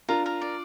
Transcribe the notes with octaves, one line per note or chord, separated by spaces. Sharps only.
D4 F4 A#4
A#4
D5